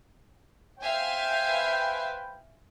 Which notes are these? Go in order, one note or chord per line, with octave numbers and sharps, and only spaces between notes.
C5 E5 F5 G5 G#5
B4